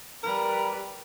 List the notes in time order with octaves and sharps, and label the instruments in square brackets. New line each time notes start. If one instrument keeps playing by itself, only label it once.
[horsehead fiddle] G3 B4 [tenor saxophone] A#4